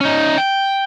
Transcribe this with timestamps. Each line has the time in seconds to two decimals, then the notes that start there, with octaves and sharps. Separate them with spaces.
0.01 C#4 D#4
0.38 G5